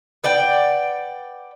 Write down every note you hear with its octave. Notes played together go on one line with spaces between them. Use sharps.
B4 D5 F#5 G5